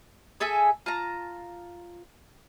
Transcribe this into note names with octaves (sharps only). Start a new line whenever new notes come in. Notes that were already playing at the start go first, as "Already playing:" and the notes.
G#4 A4 E5 G#5
F4 A5 A#5